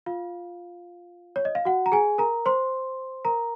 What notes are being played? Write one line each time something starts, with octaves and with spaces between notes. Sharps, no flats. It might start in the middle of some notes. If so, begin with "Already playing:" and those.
F4 F5
C#5
D#5
F5
F#4 F#5
A#5
G#4 G#5
A#4 A#5
C5 C6
A#4 A#5